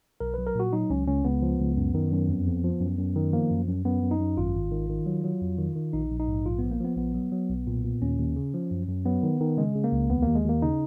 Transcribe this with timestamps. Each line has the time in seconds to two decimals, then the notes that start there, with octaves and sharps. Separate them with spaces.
0.20 B1 A#4
0.34 F#3 B4
0.47 A#4
0.55 A#2 F#4
0.73 F#3 D#4
0.90 C#2 C#4
1.07 C#2 C#4
1.25 C#2 B3
1.42 F3
1.60 C#2
1.77 F#2
1.94 D#3
2.12 F#2
2.29 F2
2.47 F2
2.64 F3
2.81 F#2
2.98 F#2
3.16 D#3
3.33 F3 A#3
3.51 F#2
3.68 F#2
3.85 F#2 B3
4.02 F#2
4.11 D#4
4.20 F#2
4.37 G#1 F4
4.54 G#1
4.72 D#3
4.89 D#3
5.06 F#3
5.24 F#3
5.41 F2
5.59 D#3
5.76 D#3
5.93 A#1 D#4
6.11 A#1
6.19 D#4
6.28 G#2
6.46 A#1 F4
6.59 F3 B3
6.71 A#3
6.80 F3 B3
6.97 A#1 B3
7.15 F#3
7.32 F#3
7.50 B1
7.67 A#2
7.84 A#2
8.02 D#2 C#4
8.19 D#2
8.36 C#3
8.54 F3
8.71 F#2
8.88 F#2
9.06 F#3 B3
9.23 D#3
9.40 D#3
9.58 C#3 G#3
9.75 C#3
9.84 A#3
9.92 C#2
10.10 D#2 B3
10.23 D#2 A#3
10.35 G#3
10.44 D#2 A#3
10.62 C#3 D#4